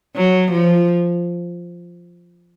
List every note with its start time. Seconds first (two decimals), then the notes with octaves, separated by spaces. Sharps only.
0.17 F#3
0.52 F3